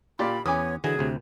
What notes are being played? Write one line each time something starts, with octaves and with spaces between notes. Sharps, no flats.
A#2 F4 G4 D5 B5
E2 B3 C#4 C#5 G#5 D6 D#6
D3 E3 F#3 F#4 G#4 G#5
D2 C3